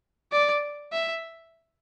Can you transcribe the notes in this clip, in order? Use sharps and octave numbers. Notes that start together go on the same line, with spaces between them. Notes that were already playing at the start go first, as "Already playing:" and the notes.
D5
E5